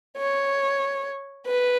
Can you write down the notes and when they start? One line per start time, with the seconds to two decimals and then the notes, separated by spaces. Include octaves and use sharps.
0.18 C#5
1.47 B4